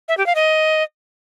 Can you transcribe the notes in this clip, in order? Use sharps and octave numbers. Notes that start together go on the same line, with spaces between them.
E5
G4
F5
D#5